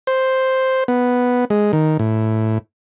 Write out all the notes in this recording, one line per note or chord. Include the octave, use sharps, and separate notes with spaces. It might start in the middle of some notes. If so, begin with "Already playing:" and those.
C5
B3
G#3
D#3
A2